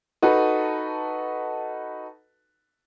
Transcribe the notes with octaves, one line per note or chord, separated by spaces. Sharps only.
D#4 F#4 A4 B4 A5